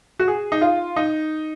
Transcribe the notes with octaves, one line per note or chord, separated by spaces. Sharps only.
F#4
G#4
D#4
F4
D#4